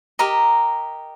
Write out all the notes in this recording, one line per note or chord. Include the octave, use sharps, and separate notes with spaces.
G4 A#4 D#5 A#5